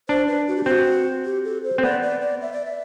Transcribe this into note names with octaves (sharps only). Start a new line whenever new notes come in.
D4 C5
B4
F#4
G4
C4 F#4
G4
A4
C5
C4
B3 D5
D5
D5
E5
D5
E5